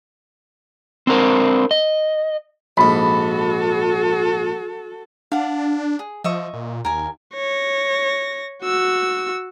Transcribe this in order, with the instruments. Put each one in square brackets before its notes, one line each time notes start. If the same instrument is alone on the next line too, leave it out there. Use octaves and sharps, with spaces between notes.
[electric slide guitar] C4 D4 A#4 C5
D#5
[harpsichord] A#1 G#2 [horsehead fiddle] F#4 A4 [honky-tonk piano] B5
[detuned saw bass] D4 [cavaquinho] F5 F#5
[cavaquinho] G#4
[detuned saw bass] F3 [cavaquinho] D#5 E5 C#6
[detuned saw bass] A#2
[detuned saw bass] D#2 [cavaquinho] A#4 G#5
[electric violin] C#5 A#6
F#4 E6